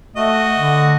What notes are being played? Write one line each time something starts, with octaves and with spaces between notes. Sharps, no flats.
A3 F#4 D#5
D3